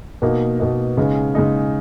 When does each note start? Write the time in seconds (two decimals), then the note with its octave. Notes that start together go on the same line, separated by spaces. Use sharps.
0.22 B2 A#3 D#4
0.60 B2 A#3 D#4
0.97 C#3 G#3 D#4
1.35 C#3 G#3 D#4